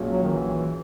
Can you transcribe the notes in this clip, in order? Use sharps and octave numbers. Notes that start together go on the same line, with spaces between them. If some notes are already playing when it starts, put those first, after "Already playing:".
Already playing: B1 A#2 G#3 C#4 F#4
F#3
D#3
E3